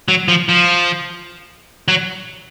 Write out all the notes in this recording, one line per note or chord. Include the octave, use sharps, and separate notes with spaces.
F#3
F3
F3
F#3